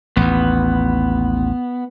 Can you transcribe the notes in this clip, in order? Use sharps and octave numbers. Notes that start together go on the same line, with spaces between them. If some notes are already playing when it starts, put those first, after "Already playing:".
A1 D#2 B3